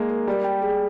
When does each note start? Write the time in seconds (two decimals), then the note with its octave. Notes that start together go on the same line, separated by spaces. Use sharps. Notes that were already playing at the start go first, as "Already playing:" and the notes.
Already playing: G#3 A#3 D#4
0.09 A#4
0.27 G3 G4
0.44 G5
0.62 G#4